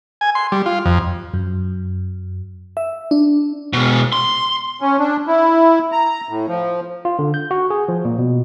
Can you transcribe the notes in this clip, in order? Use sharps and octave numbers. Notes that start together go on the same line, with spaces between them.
G#5
C6
G3
F4
F2
F#2
E5
D4
B2 G#3
C6
C#4
D4
E4
A#5
A2
F3
F4
D3
G6
F#4
G#4
F3
A#2
B2